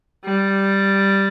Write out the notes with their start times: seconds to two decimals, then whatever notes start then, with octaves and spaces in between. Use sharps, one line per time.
0.25 G3